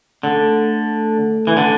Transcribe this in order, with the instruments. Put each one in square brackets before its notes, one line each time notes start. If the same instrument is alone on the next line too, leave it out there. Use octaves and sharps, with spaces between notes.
[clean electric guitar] D3 [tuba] A3
[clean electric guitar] E3
D3